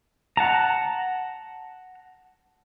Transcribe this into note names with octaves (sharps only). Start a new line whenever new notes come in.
F#5 A5 A#5